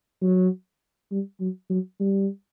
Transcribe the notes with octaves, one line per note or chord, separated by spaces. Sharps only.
F#3
G3
F#3
F#3
G3